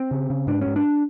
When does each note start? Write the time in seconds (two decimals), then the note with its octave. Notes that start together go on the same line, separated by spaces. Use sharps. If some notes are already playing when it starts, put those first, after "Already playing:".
Already playing: C4
0.11 C#3
0.30 C#3
0.47 G#2 D4
0.62 G#2 C#4
0.76 D4